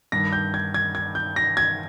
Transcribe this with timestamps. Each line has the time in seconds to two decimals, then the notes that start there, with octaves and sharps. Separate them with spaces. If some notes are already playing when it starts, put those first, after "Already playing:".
0.12 G2 D#3 A#6
0.33 G6
0.54 G#6
0.74 G#6
0.95 G#6
1.15 G6
1.36 A#6
1.57 G#6